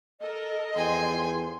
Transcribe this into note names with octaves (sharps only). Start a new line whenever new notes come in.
A4 A#4 D#5
E2 F3 A4 G5 G#5 C6